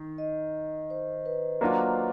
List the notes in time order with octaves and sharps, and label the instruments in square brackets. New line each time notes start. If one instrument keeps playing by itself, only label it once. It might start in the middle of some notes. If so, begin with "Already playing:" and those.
Already playing: [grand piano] D#3
[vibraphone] D#5
C5
B4
[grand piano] F#3 A#3 D4 F4